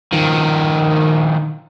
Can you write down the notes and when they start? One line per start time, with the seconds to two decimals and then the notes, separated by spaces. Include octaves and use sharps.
0.13 D#3 F3